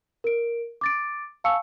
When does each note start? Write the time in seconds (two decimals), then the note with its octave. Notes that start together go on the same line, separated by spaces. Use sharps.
0.24 A#4 D7
0.81 D6 A6 D7
1.44 F5 G#5 A5 C#6 E6 C#7